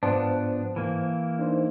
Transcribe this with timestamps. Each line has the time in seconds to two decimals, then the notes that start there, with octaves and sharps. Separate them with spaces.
0.03 G#2 F3 B3 D4 C5 A5
0.76 E3 A#3
1.39 D4 D#4 C5